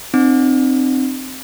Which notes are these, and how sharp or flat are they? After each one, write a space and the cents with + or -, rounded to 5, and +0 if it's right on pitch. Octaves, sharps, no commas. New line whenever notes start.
C4 -5 D#4 -45